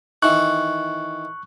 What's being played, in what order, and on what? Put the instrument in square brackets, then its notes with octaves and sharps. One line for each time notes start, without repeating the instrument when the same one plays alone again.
[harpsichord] D#3 E3 [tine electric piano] C#6 F#6